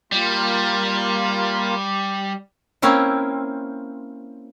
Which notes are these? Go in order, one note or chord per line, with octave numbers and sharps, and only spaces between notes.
G3 A#3 F4
A#3 C4 C#4 E4